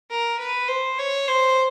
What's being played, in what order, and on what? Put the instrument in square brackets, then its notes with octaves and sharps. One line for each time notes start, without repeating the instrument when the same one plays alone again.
[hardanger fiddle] A#4
B4
C5
C#5
C5